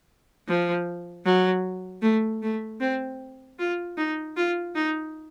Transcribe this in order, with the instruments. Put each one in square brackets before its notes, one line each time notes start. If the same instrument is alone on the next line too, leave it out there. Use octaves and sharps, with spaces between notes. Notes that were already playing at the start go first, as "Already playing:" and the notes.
[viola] F3
F#3
A3
A3
C4
F4
D#4
F4
D#4